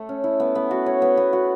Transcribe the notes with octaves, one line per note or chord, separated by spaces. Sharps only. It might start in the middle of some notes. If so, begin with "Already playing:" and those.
Already playing: A3 A4
C#4
E4
B3
B3
F#4
C#5
B3
B3
F#4